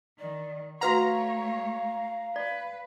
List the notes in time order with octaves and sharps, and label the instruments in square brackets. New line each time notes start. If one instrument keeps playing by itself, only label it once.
[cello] D#3 [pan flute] D5
[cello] A3 C#5 [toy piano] F#4 B4 F#5 [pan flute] F5 [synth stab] A#5
[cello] B4 [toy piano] D5